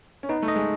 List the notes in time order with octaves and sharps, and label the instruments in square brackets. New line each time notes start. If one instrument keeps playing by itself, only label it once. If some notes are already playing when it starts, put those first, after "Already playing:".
[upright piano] C#4
[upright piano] B3 [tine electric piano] D#4
[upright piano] A3
[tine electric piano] D#5
[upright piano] G#3